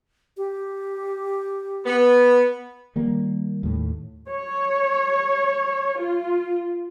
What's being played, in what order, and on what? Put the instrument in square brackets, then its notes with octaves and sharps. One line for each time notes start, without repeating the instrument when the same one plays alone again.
[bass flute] G4
[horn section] B3
[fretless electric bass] D#3 G3 A#3
D#2 A2
[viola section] C#5
F4